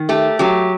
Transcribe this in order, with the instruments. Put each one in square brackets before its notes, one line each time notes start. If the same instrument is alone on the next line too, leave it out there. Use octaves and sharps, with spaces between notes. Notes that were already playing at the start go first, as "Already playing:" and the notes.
Already playing: [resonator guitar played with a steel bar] D#3
A3 G4
F#3 G4